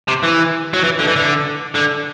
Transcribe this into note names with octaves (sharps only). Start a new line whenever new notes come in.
C3
E3
F#3
E3
D3
E3
D3
D3